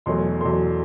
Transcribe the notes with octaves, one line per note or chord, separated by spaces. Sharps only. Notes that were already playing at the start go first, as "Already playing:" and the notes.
E2 B2 F#3 A3 C6
E2 B2 F#3 A3 C6